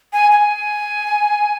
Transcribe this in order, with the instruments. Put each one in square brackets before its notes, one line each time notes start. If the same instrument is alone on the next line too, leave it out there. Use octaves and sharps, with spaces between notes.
[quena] G#5
G#5